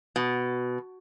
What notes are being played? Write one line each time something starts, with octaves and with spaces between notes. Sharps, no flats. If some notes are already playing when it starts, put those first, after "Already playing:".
B2